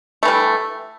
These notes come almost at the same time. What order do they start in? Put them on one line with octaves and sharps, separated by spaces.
A3 E3 G3